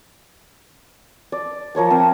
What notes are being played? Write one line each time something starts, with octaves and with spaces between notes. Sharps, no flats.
D5
F3 A#4 C#5 A5
C4 F5 D#6